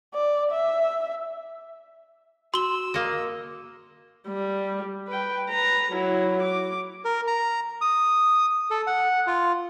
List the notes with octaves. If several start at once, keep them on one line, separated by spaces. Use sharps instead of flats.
D5
E5
F#4 C6 E6 G7
A#3 D#5
G3
B4 G5
B4 A#5
F#3 E4
D6
A#4
A#5
D#6
A4
F#5
F4